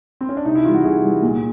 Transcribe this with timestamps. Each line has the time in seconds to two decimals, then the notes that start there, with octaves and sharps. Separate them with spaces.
0.21 C4
0.29 C#4
0.37 D4
0.45 C3 D#4
0.55 E4
0.65 E3 G3 F4
0.74 F#4
0.84 C3 G#4
1.03 E3 G3
1.22 A#2